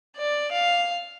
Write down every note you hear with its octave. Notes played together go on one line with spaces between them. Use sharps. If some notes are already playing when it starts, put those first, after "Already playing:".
D5
F5